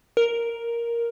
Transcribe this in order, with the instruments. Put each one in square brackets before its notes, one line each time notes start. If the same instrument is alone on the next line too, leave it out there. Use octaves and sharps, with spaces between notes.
[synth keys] A#4